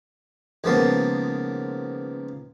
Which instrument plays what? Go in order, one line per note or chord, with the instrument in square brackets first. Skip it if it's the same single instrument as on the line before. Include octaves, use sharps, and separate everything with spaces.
[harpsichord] C#2 D#3 F3 A#3 B3 A5